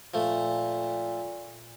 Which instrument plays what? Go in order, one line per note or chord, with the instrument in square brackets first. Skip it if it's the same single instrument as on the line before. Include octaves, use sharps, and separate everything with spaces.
[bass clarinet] A#2 [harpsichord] F3 A3